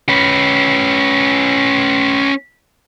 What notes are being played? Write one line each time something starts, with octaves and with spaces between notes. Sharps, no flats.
C#4 B4